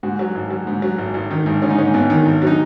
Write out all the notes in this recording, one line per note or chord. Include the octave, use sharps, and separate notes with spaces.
G#2 F#4
F#3
G#1
F#3
G#2
F#3
G#1
G#1
D#3
G#1
G#2 C#4
D#4
G#2 C#4
G#1 B3
D#3
G#1
F#3 D#4